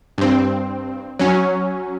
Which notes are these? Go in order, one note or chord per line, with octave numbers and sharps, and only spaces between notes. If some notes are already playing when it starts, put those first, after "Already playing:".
G2 C4
F#3 C#4